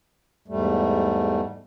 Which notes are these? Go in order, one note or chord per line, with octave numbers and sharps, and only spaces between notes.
E2 G#2 G3 A3